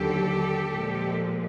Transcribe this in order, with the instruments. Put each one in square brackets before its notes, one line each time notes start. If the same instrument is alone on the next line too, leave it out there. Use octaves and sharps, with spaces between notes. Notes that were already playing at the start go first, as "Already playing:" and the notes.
Already playing: [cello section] D#2 D3 F#3 G4 A4
A#2 F3 G#3